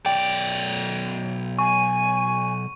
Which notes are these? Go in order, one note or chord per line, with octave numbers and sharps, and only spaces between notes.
B1 D5 G5
G#5 C#6